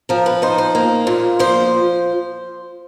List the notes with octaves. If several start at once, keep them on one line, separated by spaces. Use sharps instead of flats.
F3 A#4
B4
D#4 C5
C5
A#3
A#2
F3 C5